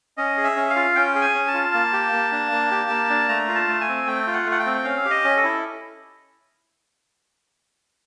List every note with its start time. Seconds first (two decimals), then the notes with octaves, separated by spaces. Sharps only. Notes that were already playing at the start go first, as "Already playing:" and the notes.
0.17 C#4 D#5
0.37 G#4
0.44 E5
0.56 C#4
0.70 F5
0.76 F4
0.96 C#4 G5
1.15 G#4
1.21 G#5
1.35 C#4
1.48 A5
1.54 F4
1.74 A#3
1.93 G4
2.13 A#3
2.32 D4
2.52 A#3
2.71 G4
2.90 A#3
3.10 D4
3.29 A3 A#5
3.48 F4
3.55 A5
3.68 A3
3.81 G#5
3.88 C4
4.07 A3 G5
4.27 F4
4.33 F#5
4.46 A3
4.52 F#5
4.59 G5
4.66 C4
4.84 C#4 F5
5.05 G4
5.11 D#5
5.24 C#4
5.37 A4
5.44 E4